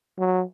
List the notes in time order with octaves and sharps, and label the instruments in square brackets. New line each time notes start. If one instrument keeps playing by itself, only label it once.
[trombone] F#3